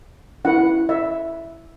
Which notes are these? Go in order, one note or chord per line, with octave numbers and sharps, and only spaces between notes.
C#4 E4 B4 F#5
E5